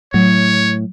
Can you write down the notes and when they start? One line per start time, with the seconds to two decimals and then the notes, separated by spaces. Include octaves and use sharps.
0.14 A2 F#3 C#5